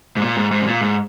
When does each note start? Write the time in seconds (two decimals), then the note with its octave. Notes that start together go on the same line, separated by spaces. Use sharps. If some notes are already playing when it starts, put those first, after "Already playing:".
0.17 G#2
0.22 A#2
0.37 G#2
0.51 G#2
0.61 C3
0.67 A#2
0.81 G#2